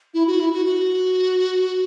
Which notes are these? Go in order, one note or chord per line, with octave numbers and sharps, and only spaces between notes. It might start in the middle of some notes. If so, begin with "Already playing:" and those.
E4
F#4
E4
F#4
F#4